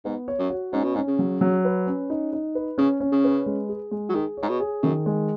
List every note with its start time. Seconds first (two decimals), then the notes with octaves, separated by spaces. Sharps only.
0.05 G#2 B3
0.28 C#5
0.39 F#2
0.50 F#4
0.72 G#2 C#4
0.84 B2
0.95 G#2 C#4
1.08 C#3
1.19 F#3
1.41 F#3
1.65 B4
1.87 C#4
2.10 D#4
2.33 D#4
2.55 B4
2.78 C#3 C#4
3.00 C#4
3.12 C#3
3.24 B4
3.46 G#3
3.69 G#4
3.91 G#3
4.09 F#3
4.15 D#3 G#4
4.37 C#5
4.43 G#2
4.49 B2
4.60 G#4
4.83 F#2 D#3
5.06 G#3